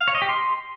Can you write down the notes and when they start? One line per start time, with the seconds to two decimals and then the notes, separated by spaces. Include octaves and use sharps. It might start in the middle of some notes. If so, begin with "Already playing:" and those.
0.01 F5
0.08 C#5
0.15 D#5
0.22 G4
0.29 C6